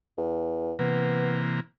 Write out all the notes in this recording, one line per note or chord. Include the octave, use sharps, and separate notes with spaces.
E2
C3 E3 A#3 B3